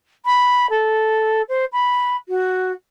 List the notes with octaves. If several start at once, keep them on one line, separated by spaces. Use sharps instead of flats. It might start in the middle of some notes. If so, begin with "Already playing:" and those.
B5
A4
C5
B5
F#4